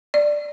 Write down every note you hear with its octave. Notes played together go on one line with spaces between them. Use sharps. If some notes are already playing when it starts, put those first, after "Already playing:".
D5